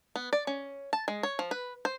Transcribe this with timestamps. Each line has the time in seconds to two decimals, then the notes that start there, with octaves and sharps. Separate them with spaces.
0.16 B3
0.33 D5
0.47 C#4
0.93 A5
1.08 G#3
1.23 C#5
1.39 F3
1.51 B4
1.85 C5